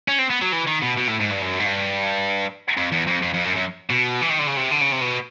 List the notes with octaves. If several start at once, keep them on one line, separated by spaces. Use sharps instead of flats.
C#4
C4
B3
F#3
E3
D#3
B2
B2
A2
G#2
G2
F#2
G#2
G2
F2
E2
F2
F2
F2
F#2
F#2
B2
E3
D#3
D3
C#3
C3
D3
C#3
C3
B2